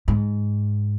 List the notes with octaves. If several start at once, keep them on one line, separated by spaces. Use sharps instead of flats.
G#2